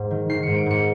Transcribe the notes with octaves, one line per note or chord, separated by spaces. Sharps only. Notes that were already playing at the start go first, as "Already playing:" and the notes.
Already playing: G#2
D#3
D#3 C7
G#2 C#7
D7
G#2 C#7